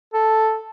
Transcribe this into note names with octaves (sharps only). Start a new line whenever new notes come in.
A4